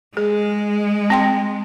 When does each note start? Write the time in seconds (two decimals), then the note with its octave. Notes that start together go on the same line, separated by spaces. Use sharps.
0.17 G#3 G#4
1.10 C4 G5 C6